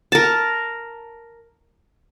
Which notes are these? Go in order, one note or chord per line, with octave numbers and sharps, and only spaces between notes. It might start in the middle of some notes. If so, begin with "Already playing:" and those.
A#4 A5